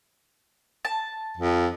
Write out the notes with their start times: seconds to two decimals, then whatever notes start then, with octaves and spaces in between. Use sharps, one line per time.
0.85 A5
1.37 F2